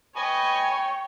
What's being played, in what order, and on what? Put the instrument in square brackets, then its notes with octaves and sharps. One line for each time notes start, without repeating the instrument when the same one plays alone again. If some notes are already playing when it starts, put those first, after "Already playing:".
[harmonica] B4 D#5 G#5 [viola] C#5 G5